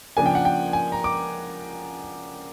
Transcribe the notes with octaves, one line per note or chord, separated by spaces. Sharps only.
C#3 F3 A#3 D4 G#5
G5
F#5
G5
G#5
A#5
D6